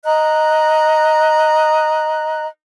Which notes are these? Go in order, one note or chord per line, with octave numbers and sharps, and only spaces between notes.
D#5 A#5 F#6